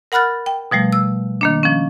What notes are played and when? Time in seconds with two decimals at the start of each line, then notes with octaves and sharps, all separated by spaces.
0.12 A#4 F#5 B5 F6 F#6 A6
0.46 G5
0.71 B2 F3 G3 A3
0.93 E6
1.41 D#3 A#3 D4
1.63 F3 C#4